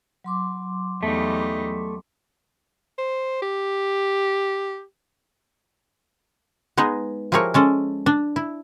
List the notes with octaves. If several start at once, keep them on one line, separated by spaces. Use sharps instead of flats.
F#3 C6 D6
E2 G3 A3 D#4
C5
G4
G#3 B3 D#4 G#4
F3 E4 G4 G#4 A#4 C#5
G#3 C#4 A4
D4
E4